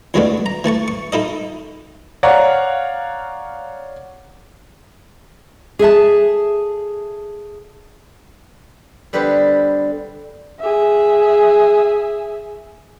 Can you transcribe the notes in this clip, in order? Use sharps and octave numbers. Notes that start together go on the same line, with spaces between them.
E2 F#3 G#3 A3 B3 D4
A#5
E3 A3 A5 C#6
C#6
D#4 E4 A4 D#5
C#5 D5 F5 F#5 A#5
G#4 A4 E5 A5
D3 G3 B3 G4 B4 C5
G#4 E5